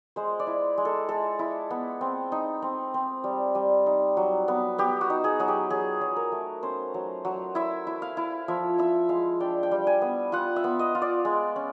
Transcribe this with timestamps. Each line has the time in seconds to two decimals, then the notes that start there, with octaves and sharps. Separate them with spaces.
0.16 G#3 C5
0.39 D5
0.47 E4
0.78 G#3
0.85 A4
1.09 G#3 A4
1.39 E4
1.71 B3
2.01 C4
2.32 D#4
2.62 C4
2.94 C4
3.24 G3
3.55 G3
3.86 D#4
4.17 F#3
4.48 B3
4.78 B3 G4
5.01 F#4
5.10 D#4
5.24 G#4
5.40 F#3 G#4
5.48 G4
5.70 F#3 G#4
6.01 F#3
6.16 A#4
6.32 A3
6.63 C#4 C5
6.94 F#3
7.25 F#3
7.55 E4 E5
7.87 E4
8.02 F5
8.17 E4
8.48 F3 E5
8.78 E4 E5
9.09 G#3 F5
9.40 D4 G5
9.63 G5
9.71 G3
9.87 G#5
10.02 B3
10.32 F4 F#5
10.56 E5
10.64 B3
10.79 D#5
10.95 F4
11.02 D5
11.25 G#3
11.56 C#4